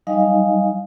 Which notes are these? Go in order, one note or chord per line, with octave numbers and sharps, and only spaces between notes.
F#3 G3 D#4 D#5 F5 G#5